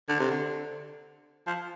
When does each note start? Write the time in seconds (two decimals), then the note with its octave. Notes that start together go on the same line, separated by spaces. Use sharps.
0.08 D3
0.19 C3
0.31 D3
1.47 F3